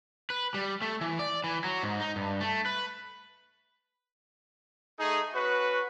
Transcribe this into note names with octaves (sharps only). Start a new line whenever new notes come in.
B4
G3
A3
E3
D5
E3
F#3
G#2
D#4
G2
A3
B4
A3 D#4 G#4
C#4 F#4 B4